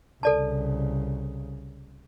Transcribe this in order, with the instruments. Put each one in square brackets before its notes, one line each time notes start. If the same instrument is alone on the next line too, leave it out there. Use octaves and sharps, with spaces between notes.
[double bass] C2 C#3 [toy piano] A4 D5 A5